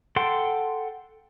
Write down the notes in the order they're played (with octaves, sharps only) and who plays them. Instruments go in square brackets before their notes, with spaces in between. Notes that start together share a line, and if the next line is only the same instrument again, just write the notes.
[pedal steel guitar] A4 F#5 G5 C6